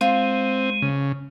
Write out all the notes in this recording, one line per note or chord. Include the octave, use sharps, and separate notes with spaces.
G#3 C4 F4
C#3